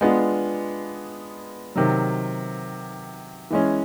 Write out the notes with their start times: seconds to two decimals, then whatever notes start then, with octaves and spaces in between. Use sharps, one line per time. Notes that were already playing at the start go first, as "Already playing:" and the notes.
0.01 G#3 B3 D4 F4
1.75 C3 D#3 F#3
3.51 E3 G#3 C#4